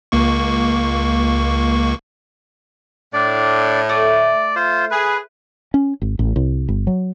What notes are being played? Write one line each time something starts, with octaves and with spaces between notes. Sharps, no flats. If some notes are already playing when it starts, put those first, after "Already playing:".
C#2 A#3 C#6
A2 D4 D5
A3 D5
F4 C5
G#4 B4
C#4
G#1
A1
C2
G1
F#3